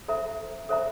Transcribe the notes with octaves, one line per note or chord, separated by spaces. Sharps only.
A4 C5 E5 A#5
A4 C5 E5 A#5